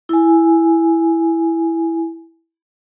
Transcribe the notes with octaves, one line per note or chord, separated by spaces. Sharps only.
E4 G#5